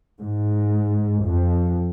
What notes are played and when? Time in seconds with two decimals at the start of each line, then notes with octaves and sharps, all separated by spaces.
0.20 G#2
1.26 F2